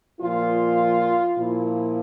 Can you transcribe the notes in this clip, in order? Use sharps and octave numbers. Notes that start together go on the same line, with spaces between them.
A#2 F3 F4
A#2 F3 E4